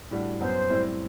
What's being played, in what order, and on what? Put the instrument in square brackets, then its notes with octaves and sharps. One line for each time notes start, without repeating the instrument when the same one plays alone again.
[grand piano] A2 G3 D4 F#4
[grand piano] F#2 F#3 B3 [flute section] C5
[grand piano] A2 G3 C4 E4